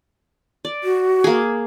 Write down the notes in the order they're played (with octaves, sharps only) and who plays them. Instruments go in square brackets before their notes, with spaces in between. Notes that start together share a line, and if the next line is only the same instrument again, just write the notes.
[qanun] D5
[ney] F#4
[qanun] A#3 G#4